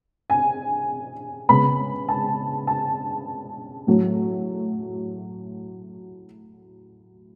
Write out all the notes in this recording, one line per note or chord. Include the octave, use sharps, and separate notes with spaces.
G#5
C#3 G#3 B3 B5
A5
A5
A2 F#3 A3